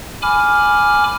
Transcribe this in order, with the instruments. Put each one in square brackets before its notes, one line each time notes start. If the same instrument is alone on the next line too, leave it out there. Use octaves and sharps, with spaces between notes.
[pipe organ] G#5 B5 D6 F6